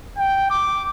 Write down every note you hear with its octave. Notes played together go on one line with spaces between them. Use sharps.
G5
D6